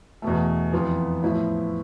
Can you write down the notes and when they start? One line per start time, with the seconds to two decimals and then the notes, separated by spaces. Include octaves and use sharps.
0.22 E2 B2 A3
0.72 F2 E3 B3 F4
1.23 A2 F3 B3 E4